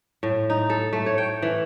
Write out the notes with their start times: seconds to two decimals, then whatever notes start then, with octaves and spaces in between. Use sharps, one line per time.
0.23 A2
0.50 D#4
0.70 A4
0.93 A3
1.06 C#5
1.18 G5
1.42 E3